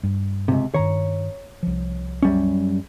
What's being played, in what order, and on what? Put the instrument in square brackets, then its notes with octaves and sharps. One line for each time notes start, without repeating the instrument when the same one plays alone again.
[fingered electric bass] G2 G3
[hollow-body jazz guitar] C#2 C3
[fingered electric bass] G2 D#3 [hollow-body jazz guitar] C#5 A#5
[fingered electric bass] C2 F3
[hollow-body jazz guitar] F#2 G3 C#4